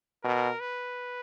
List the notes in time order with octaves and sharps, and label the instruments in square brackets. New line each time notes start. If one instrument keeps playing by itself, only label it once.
[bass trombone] B2 [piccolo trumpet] A#4
[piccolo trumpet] B4